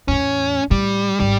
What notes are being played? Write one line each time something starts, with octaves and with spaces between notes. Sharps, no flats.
E2 A2 C#4
A2 G3
G#1 G3